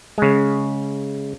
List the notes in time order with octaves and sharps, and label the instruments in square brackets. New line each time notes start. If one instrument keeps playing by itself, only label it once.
[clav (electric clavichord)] C#3 G#3